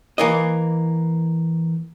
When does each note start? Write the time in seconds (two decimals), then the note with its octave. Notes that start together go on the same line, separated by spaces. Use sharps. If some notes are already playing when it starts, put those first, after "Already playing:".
0.18 E3 A#3 D#5